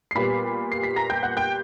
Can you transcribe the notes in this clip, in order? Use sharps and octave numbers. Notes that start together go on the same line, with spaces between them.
C7
A#2 G3 B3 B5 B6
C7
B6
A#5 A#6
G5 G6
F#5 F#6
G5 G6